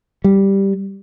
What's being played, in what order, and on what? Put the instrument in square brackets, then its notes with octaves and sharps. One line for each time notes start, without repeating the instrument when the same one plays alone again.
[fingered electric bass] G3